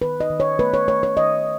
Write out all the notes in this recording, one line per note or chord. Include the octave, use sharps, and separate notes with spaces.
D#3 B4
D#5
D#3
C#5
A3 B4
C#5
A3 C#5
C#5
D#3 D#5